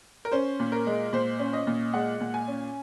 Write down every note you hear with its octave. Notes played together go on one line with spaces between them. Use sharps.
A#4
C#4 C5
A#2
A#4
G#3
A#2 C5
C#4
D#5
A#2
G#3 F#5
A#2
G#5
C#4